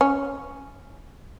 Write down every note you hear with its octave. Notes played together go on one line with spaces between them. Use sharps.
C#4